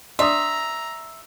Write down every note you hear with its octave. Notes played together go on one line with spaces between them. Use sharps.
D4 E5 A#5 C6 D#6